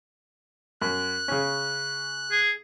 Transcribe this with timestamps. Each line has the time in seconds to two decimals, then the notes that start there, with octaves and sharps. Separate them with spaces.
0.82 F#2 F#6
1.28 C#3 C#4
2.31 G#4